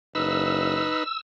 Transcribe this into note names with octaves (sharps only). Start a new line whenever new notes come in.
F#1 D#4 B4 E6